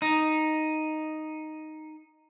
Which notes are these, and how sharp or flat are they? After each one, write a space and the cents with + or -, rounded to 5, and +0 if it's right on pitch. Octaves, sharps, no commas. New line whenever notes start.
D#4 +0